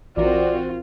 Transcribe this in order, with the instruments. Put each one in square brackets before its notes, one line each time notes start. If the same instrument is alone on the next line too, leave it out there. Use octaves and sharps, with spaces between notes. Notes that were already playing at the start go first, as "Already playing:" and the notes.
[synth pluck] A#1 E3 A#4 [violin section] C4 F#4 [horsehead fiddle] F4 [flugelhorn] D5